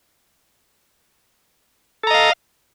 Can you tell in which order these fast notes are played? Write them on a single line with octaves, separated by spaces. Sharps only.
A4 A#5 D#5 F5